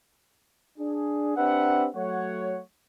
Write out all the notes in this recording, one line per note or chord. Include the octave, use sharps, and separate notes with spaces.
D4 G#4
C4 D4 G4 B4 E5 F#5
F#3 A3 C#5 F#5